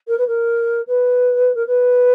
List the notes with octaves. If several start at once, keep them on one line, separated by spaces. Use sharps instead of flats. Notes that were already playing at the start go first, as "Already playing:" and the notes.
A#4
B4
A#4
B4
A#4
B4